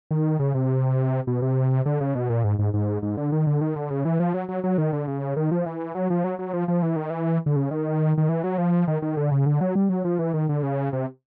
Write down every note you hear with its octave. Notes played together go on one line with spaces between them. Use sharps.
D#3
C#3
C3
B2
C3
D3
C#3
B2
A#2
G#2
G#2
G#2
G#2
D3
D#3
D3
D#3
D3
C#3
E3
F3
F#3
F#3
F#3
D#3
D3
C#3
D#3
F3
E3
F#3
F3
F#3
F#3
F3
F3
E3
D#3
E3
D3
C#3
D#3
D#3
E3
F#3
F3
D#3
D#3
D3
C#3
D3
F#3
G3
F#3
F3
E3
D#3
D3
C#3
C3